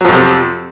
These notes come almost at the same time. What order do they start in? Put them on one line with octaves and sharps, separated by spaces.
F#3 F3 F2 C3